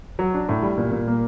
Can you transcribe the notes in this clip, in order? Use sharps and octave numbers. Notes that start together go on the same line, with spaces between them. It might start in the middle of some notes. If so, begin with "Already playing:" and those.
F#3
D4
A2
G3
A#2
A#2
A#3